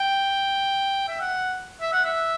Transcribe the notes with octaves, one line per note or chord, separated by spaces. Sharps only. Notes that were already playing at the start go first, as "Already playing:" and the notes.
Already playing: G5
E5
F#5
E5
F#5
E5